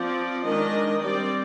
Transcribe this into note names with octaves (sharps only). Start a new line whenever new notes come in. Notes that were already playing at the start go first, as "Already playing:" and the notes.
Already playing: F3 C4 D5
D#3 G#3 D4 D#5
G3 C4 D5